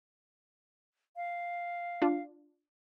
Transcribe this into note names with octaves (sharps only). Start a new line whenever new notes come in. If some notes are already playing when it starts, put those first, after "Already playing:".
F5
D4 F4